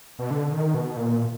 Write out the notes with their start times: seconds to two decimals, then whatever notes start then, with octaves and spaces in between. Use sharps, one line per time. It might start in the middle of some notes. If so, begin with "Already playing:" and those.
0.19 B2
0.31 D3
0.52 D#3
0.74 B2
0.97 A#2